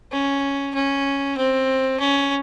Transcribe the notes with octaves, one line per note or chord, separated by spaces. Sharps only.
C#4
C#4
C4
C#4